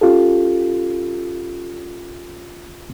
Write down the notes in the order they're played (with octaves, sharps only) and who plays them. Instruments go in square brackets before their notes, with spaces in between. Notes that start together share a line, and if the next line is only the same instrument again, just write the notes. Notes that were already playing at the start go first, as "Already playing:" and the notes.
[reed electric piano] C#4 F4 G4 A4